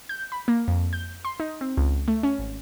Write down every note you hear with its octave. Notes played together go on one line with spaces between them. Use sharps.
G6
B5
A#3
F2
G6
C6
D#4
C4
C#2
A3
C#4
G#1